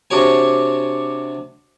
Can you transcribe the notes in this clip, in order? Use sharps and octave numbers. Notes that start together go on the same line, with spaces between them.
C3 D4 F#4 C#5 G#5